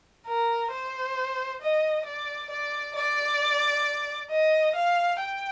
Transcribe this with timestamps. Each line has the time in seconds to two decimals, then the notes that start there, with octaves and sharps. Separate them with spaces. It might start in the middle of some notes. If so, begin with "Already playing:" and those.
0.27 A#4
0.72 C5
1.61 D#5
2.05 D5
2.50 D5
2.96 D5
4.31 D#5
4.76 F5
5.21 G5